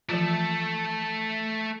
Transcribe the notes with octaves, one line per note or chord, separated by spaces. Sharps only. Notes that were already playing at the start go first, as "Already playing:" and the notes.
E3 F3 A3 F4 A4